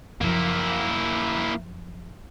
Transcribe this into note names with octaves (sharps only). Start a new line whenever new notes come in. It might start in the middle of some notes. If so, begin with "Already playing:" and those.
F#2 F3 A#3 E4